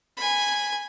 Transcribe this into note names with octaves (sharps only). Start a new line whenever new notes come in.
G#5 B5